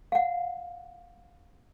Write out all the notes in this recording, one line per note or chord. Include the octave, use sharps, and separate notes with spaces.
F5 F#5